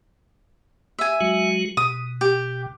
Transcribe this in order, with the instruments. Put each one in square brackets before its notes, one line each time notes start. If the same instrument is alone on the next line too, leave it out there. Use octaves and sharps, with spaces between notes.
[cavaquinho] E5 G#5
[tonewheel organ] F#3 G#3 F#4
[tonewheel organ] B2 [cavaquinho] D#6
[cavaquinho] G4